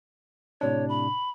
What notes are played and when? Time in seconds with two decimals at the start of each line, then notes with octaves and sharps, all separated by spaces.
0.61 A2 C3 D4 C#5
0.89 B5